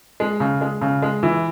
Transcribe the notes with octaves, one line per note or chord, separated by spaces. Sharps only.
G#3
C#3
G#3
C#3
G#3
E3